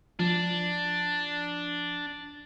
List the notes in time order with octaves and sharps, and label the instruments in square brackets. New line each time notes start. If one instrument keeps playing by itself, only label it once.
[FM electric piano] F3 [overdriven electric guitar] D4